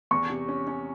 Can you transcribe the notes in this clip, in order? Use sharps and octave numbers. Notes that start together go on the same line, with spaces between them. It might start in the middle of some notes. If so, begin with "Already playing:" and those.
E2 C#6
C3
C#4
C#4